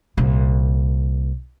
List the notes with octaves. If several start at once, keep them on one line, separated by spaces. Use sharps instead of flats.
C2 A#2